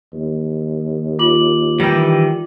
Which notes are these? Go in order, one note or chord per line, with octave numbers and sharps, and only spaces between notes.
D#2
F4 D6 F#7
D#3 E3 G3 G4